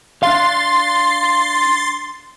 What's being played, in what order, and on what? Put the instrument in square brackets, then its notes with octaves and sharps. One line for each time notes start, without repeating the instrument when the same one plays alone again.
[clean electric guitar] D4 F5 [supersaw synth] C6 A6